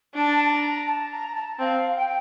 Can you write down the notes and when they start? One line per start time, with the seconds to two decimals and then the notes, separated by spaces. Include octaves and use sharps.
0.15 D4 A5
0.51 A#5
0.87 A5
1.11 A#5
1.36 A5
1.59 C4 F5
1.96 G5